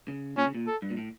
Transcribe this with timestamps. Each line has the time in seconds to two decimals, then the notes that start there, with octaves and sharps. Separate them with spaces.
0.08 C#3
0.37 A#2 C#4
0.46 C#3
0.55 A#2
0.67 A4
0.82 G2
0.90 A#2
0.97 A2